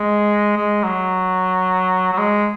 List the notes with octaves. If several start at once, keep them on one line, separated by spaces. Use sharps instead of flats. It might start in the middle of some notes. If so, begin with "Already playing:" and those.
Already playing: G#3
G#3
F#3
F#3
G#3